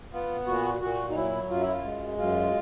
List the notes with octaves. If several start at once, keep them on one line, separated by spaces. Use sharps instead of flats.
B3 F4
A#2 F#4
A#2 F#4
D#4
F#3 E4
F#2 F4
E4
F4
G#3
F#2 F4